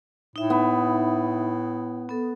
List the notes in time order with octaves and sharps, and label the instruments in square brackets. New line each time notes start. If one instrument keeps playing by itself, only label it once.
[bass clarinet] A2 [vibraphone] D#4 E5
[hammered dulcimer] B3
[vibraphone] B3 A4